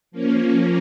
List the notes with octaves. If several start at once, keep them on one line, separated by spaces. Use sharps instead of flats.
F3 A#3 C#4